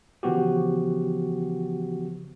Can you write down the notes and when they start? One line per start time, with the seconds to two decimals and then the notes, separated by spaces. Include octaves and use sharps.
0.23 C#3 E3 F3 B3 F#4 G4